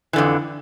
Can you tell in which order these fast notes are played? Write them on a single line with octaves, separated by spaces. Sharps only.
E3 D3 F2